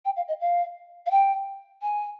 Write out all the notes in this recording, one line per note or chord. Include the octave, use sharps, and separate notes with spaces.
G5
F5
D#5
F5
F5
G5
G#5